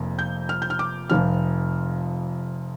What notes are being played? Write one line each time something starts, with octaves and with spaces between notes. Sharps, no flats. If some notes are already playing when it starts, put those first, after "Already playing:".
Already playing: F1 F2 A#3
G6
F6
G6
F6
D6
F1 F2 F3 F6